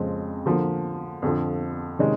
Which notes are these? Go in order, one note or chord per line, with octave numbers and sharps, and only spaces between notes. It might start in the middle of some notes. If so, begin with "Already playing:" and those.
Already playing: F2 C#3 F3 G#3 C4
D3 F3 A#3
F2 D3 F3
C3 D#3 G#3 C#4